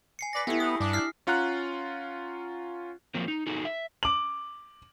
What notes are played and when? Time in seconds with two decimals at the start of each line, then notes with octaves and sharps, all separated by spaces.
0.19 G#5 C7 C#7
0.33 B4 D5 A#6 B6
0.47 A3 B3 E4 G4
0.60 A3 D#6
0.80 G2 D4
0.93 E4 F6 C7
1.27 C#4 F4 F#5 A#5 F#6
3.14 F3 F#3 A#3 C4
3.28 D#4
3.47 D#4 F#4 G#4 A4
3.65 E5
4.03 D6 F#7